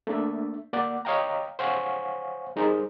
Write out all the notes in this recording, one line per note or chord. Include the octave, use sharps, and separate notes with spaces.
A3 A#3 D4 E5
A#3 D5 F#5
C#5 D#5 F5 G5 A#5
C5 C#5 F5 F#5 G#5 C#6
G3 D#4 G#4 A#4 C5